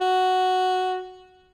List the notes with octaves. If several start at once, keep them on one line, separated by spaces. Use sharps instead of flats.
F#4